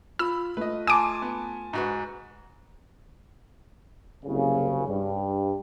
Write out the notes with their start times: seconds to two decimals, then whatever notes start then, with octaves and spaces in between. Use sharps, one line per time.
0.19 F4 B5 E6
0.57 A3 F4 B4 D#5
0.87 G#5 A5 C6 D6 D#6
1.22 B3
1.73 G#2 F#4 B4
4.25 F#1 C2 C#3
4.87 G2